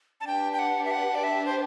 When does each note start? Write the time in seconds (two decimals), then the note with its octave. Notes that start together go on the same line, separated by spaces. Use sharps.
0.21 A5
0.26 D4 G4 B4 G5
0.53 G5
0.59 F#5
0.85 E5
0.91 F#5
1.15 D5
1.24 E5
1.46 C5